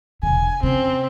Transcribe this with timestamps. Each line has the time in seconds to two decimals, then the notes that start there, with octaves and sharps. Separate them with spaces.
0.23 E1 D3 G#5
0.63 F2 C#3 C4